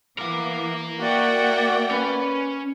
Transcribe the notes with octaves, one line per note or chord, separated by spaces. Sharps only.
E3 B3 A#4 F5 D6
A#3 F#4 D5 E5 F#5 G5
C#4 B4